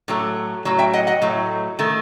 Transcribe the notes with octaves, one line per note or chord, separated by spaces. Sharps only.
A2 F#3 A3
A2 F#3
E5 G5
D#5 F#5
D#5 F#5
A2 F#3 A3
D#3 A3